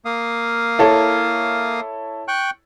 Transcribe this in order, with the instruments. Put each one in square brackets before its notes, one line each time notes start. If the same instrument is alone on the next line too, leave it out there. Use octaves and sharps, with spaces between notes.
[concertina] A#3 F5 D#6
[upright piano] E4 A4 C#5
[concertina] G5 C#6 F#6